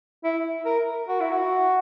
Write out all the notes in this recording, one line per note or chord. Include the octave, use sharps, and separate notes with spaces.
E4
A#4
F#4
E4
F#4